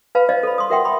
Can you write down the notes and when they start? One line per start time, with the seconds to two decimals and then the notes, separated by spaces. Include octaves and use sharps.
0.15 B4 F5 A5 B5
0.29 C5 D5 D#5 F5
0.43 A4 B5
0.58 C6 D#6
0.70 F#4 A#4 E5 F#5 G5 C6
0.85 B5 C6 D#6